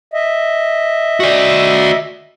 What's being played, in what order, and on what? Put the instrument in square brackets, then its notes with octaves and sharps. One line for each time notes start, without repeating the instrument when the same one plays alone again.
[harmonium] D#5 E5
[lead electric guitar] F#4 D5